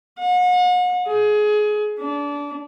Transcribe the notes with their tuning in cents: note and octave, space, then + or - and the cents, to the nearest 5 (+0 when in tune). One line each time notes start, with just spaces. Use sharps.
F#5 -40
G#4 +25
D4 -25